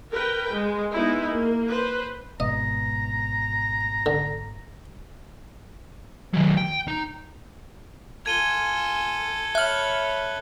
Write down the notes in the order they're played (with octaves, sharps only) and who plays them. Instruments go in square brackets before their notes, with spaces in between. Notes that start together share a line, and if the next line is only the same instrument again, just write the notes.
[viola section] A#4 B4 G5
G#3
G#3 B3 D#4 E4
A#3
B4 C5
[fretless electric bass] G#1 G#2 B2 [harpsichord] D#5 [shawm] A#5
[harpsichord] D3
[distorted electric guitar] D#3 F#3
G5
D#4
[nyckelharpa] F4 G#5 [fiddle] A4 [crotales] G#6 D#7 G7
[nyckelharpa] C#5 B5 [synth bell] E5 F6 [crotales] F#6 F#7